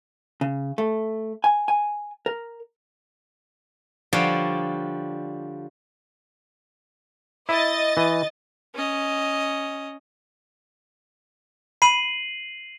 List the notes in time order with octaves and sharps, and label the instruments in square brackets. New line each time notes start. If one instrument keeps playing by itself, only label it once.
[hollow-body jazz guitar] C#3
A3
G#5
G#5
A#4
[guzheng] D3 F3 G3 C#5 D5 F5
[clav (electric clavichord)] E4 [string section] D#5 A6
[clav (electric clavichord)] E3
[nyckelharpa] C#4 D#5
[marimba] B5 [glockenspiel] C7 D#7 F#7